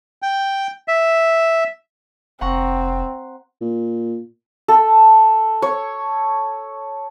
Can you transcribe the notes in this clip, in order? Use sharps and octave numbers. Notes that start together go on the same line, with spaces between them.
G5
E5
F1 C4 F#5 A#5 C#6
A#2
A4
C#5